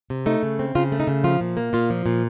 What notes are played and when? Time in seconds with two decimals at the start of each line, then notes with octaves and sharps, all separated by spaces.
0.10 C3
0.26 A3 D#4
0.43 C#3
0.59 C4
0.75 C#3 F4
0.92 A3
1.00 D#4
1.07 C#3
1.24 F3 F4
1.41 A#2
1.57 A#3
1.73 A#2 F4
1.90 F3
2.06 A#2